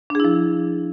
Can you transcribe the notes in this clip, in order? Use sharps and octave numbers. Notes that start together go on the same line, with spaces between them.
F3 D4 E4 G#4